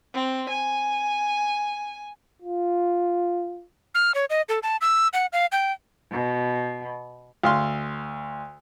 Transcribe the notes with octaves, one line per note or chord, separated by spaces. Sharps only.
C4
G#5
F4
F6
C#5
D#5
A4
A5
E6
F#5
F5
G5
B2
D2 F5 C6